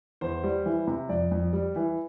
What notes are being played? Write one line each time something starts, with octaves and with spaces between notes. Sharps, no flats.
E2 C5
G3
E3
C3
F2 D5
F2
G3
E3